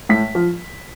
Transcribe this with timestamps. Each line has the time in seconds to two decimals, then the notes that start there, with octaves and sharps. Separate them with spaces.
0.09 A2 B6
0.35 F3